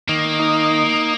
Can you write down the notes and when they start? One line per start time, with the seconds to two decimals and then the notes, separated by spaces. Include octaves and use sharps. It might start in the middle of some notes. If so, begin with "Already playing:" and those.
0.08 D#3 A#3
0.40 D#4